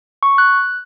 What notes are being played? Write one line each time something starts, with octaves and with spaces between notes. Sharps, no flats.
C#6
F#6